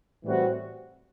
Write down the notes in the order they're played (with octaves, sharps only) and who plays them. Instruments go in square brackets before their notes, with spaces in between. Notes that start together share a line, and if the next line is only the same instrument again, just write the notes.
[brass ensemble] A2 E3 G3 C4 F#4